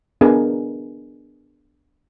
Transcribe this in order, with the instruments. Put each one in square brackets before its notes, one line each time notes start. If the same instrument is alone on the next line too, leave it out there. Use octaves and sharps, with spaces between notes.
[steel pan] B3 D4 G#4 A#4